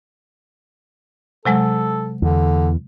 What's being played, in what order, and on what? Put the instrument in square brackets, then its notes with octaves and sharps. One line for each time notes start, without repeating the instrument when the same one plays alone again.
[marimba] C3 F#3 G#3 [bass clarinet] A4
[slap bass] E2 [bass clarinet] D3